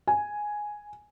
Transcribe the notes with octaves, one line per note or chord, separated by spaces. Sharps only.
G#5